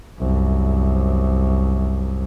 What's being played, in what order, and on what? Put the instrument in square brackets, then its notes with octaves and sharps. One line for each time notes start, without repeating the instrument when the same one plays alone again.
[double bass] C2 F#2